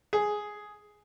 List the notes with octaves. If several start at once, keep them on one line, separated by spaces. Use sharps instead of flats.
G#4